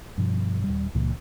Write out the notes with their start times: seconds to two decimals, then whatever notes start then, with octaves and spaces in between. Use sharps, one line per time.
0.18 G2 B2 F3
0.64 D#1 B1 G3
0.95 C#2 A#2 E3